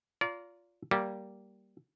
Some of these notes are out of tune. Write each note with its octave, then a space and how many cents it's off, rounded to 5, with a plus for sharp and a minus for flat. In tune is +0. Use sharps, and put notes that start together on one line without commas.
F4 +0 D5 -35 A#5 +0
G3 -15 A#3 +0